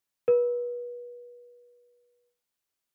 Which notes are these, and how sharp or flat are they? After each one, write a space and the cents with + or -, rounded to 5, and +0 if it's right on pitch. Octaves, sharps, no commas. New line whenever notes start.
B4 -35